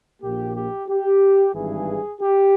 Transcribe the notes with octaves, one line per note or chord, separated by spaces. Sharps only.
A#1 A#2 A#3 G4
G4
G4
G#1 G2 E3 G#4
G4